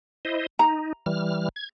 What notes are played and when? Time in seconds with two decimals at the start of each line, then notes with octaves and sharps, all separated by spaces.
0.25 E4 C5 D#5
0.59 D#4 A#5
1.06 E3 G3 F6
1.56 G#6